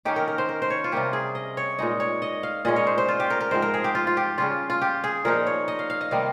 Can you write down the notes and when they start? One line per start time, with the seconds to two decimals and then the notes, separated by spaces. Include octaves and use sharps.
0.05 D#3 A#3 C#4 G4
0.16 A#4
0.28 A#4
0.38 C5
0.49 A#4
0.62 C5
0.70 C#5
0.84 F4
0.92 C3 G3 A#3 C#4 G4
1.13 G#4
1.35 D#5
1.57 C#5
1.79 A#2 G#3 D#4 D#5
2.00 C#5
2.22 D#5
2.43 F5
2.65 A#2 G#3 C#4 D#5
2.76 C#5
2.87 C5
2.98 C5
3.08 F4
3.20 G4
3.30 A#4
3.41 A#4
3.51 G#2 F3 C4 C5
3.62 A#4
3.74 G#4
3.84 G4
3.95 F4
4.07 F4
4.17 G4
4.38 C#3 G3 C#4 F4
4.70 F4
4.82 G4
5.04 G#4
5.25 A#2 F3 A#3 D#4 A#4
5.47 C#5
5.68 D#5
5.79 F5
5.90 F5
6.01 D#5
6.11 C3 D#3 G3 A#3 F5